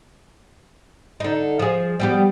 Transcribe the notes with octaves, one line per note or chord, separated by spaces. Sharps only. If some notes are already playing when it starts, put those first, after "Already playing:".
D3 D#4
F3 G#4
G3 B3 G4